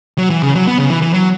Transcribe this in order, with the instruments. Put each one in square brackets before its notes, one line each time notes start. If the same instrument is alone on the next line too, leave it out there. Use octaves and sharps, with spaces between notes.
[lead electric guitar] F#3
E3
C#3
F#3
B3
C#3
E3
E3
F#3